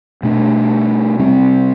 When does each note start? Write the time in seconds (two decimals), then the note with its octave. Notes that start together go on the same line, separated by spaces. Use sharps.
0.23 B2 A3 D4
1.19 C3 G3 C4